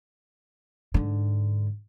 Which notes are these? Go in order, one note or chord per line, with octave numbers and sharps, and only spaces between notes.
G#2 D3